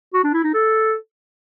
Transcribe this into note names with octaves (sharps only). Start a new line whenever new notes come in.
F#4
D4
E4
D#4
A4